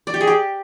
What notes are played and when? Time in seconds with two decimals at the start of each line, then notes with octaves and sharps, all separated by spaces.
0.07 D5
0.14 G4
0.21 G#4
0.27 G4